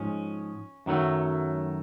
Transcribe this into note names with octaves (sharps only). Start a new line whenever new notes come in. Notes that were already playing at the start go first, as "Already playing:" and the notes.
Already playing: G#2 F3 G#3 C#4
F#2 D#3 F#3 A3